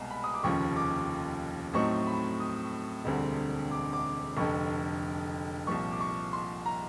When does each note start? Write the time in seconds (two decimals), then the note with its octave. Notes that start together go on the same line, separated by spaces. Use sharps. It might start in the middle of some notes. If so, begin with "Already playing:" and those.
Already playing: C2 B2 G#3 G#5 A#5
0.11 B5
0.24 D#6
0.34 D6
0.43 F1 D#2 C#3 F3 C#6
0.76 D6
1.74 A2 F#3 A3 C4 D#4 C#6
2.07 B5
2.40 D#6
3.05 E1 D2 D3 G3 C4
3.71 D6
3.93 D6
4.37 F1 F2 D3 C#6
5.67 C2 A#2 F3 C#6
5.91 D6
6.00 C#6
6.33 C6
6.66 A#5